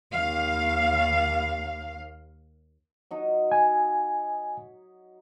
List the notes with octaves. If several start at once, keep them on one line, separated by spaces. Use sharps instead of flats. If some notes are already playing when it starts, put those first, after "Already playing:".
D#2 F5
F#3 D#4
G#5